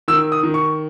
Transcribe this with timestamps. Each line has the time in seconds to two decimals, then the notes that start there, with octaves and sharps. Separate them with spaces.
0.08 D#3 E6
0.32 D#6
0.43 D#3
0.54 C#6